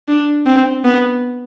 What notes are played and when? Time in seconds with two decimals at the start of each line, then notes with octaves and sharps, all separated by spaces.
0.08 D4
0.46 C4
0.84 B3